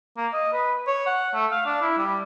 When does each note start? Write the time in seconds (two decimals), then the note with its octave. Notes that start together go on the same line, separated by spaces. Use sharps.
0.17 A#3
0.33 D#5
0.53 B4
0.87 C#5
1.07 F#5
1.34 A3
1.52 F5
1.66 D4
1.82 E4
1.98 G3